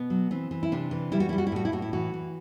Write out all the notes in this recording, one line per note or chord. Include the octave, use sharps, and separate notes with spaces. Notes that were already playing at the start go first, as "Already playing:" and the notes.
Already playing: B2 B3
F#3
E3 C4
E3
E4
C3 D4
E3
G3 E4
F#4
G3 E4
F#4
E4
A2 F#4
E4
A2 F#4
E4
E3 F#4
E3